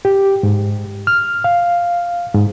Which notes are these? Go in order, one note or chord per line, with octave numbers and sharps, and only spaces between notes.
G4
G#2
F6
F5
G#2